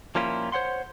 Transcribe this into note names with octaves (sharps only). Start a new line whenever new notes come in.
F3 G3 A#3 C#4 E4 F4
C5 C#5 F#5 C6